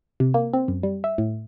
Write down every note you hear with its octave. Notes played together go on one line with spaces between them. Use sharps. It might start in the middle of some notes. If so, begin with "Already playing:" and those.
C3
A#3
C4
F#2
G3
E5
A2